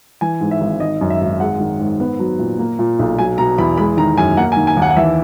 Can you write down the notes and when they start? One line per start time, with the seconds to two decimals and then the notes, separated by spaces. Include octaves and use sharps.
0.21 E3 G#5
0.41 G#2
0.51 E5
0.61 G#1
0.80 D#3 D#5
1.01 F#2
1.10 E5
1.21 G#1
1.40 G#3 F#5
1.60 D#3
1.80 G#2
2.00 B3
2.19 F#3
2.39 A#2
2.59 A#3
2.79 A#2
2.99 B1
3.18 F#3 G#5
3.38 B2 A#5
3.58 E2 B5
3.78 G#3 B5
3.97 D#3 A#5
4.18 F#2 G#5
4.37 A#3 F#5
4.52 G#5
4.57 D#3
4.67 G#5
4.77 D#2 F#5
4.91 F#5
4.96 E3 E5